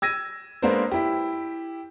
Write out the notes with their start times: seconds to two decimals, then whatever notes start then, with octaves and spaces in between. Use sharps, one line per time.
0.02 E6 G#6 A#6 D#7
0.62 G#3 A#3 B3 D4 A#4 C5
0.92 E4 G4